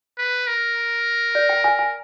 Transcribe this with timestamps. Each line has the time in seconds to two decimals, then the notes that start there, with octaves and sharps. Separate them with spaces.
0.18 B4
0.47 A#4
1.35 D5
1.49 G5
1.64 G#5
1.79 G#5